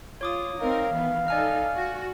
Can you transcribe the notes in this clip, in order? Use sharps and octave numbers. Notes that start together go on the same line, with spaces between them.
F4 C#5 D6 D#6
C4 D#4 A#4 F5
D#3 E3 B3
D#4 A4 D5 G#5 F6
F#4